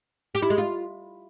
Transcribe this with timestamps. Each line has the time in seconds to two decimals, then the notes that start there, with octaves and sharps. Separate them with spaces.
0.35 G4
0.42 E4
0.50 G#3
0.58 F4